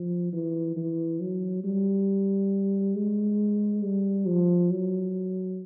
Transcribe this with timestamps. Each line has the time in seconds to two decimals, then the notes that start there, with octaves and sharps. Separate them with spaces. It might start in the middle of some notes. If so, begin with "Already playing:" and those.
Already playing: F3
0.33 E3
0.77 E3
1.20 F#3
1.64 G3
2.95 G#3
3.83 G3
4.27 F3
4.71 F#3